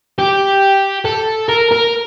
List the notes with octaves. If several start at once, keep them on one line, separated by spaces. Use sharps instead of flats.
G4
A4
A#4
A#4